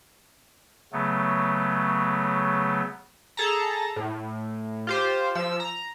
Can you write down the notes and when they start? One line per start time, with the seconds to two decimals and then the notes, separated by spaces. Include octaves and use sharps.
0.93 C#3 F#3 A3 B3
3.37 G#4 A4 A5 A#5
3.96 A2
4.87 F4 G4 C5
5.35 F3 E6
5.60 A#5